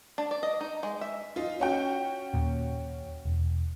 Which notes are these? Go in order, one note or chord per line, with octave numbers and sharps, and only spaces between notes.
D4
D5
D#5
D#4
G#3
E5
D#4 F4
C#4 F#4 G5
D#2 A#2
E1